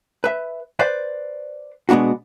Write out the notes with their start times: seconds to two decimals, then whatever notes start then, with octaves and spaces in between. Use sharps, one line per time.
0.24 B4 E5
0.79 B4 C5 D5
1.89 B2 G#3 B3 D4 F#4